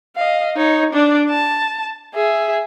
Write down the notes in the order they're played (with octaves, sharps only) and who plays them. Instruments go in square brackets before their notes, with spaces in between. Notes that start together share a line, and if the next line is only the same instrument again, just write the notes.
[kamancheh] D#5 F5
D#4 C#5
D4 D5
A5
G#4 E5